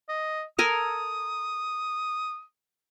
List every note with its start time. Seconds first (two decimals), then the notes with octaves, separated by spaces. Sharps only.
0.09 D#5
0.59 A4 A#4 G#5 D#6